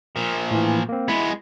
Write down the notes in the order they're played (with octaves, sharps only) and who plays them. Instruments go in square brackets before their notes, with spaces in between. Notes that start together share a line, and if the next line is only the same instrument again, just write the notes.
[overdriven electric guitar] A#2 F3 [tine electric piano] A#4
[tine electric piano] A2 E3
A#3 C4
[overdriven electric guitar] G#3 B3 [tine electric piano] E4 B5